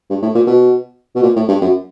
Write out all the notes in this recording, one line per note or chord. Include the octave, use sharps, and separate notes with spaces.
G2
A2
A#2
B2
B2
A#2
A2
G2
F#2